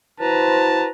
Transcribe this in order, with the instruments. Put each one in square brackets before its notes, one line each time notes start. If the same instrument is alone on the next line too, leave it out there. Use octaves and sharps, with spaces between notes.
[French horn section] E4 F#4 C5 [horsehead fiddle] B4 A#5 [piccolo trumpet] A5